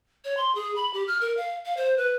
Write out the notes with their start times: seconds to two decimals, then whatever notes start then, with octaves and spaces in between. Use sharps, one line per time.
0.25 C#5
0.37 C6
0.55 G#4
0.76 B5
0.94 G4
1.08 F6
1.21 A#4
1.37 F5
1.65 F5
1.77 C5
1.97 B4